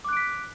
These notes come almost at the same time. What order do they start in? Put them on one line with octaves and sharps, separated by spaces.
D6 F#6 D7 B6